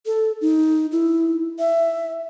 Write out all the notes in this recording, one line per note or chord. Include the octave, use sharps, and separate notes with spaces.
A4
D#4
E4
E5